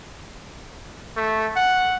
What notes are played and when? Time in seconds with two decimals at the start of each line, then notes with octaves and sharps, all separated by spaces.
1.16 A3
1.56 F#5